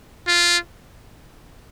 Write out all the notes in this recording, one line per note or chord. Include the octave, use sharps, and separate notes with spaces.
F4